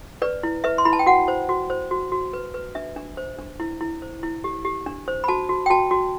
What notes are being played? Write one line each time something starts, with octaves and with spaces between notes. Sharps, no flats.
B4 D5
E4
B4 E5
C6
E4 B5
A5
G5
F#4 F#5
C5
F#4
C5
F#4
F#4
B4
B4
D4 E5
D4
C5
D4
E4
E4
C5
E4
G4
G4
D4
C5
B5
F#4 A5
F#4
G5
F#4 A5
F#4